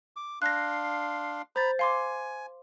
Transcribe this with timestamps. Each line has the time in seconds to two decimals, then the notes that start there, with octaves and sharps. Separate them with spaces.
0.16 D6
0.42 D4 F5 C6 F#6 A#6
1.56 C5 A#5 B5 A6
1.79 F5 G#5 C6 D6